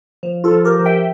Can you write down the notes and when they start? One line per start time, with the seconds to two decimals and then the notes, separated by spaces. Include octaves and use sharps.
0.23 F3
0.44 F4 A4
0.51 F3
0.65 G4 A#4
0.79 F3
0.86 E5 G5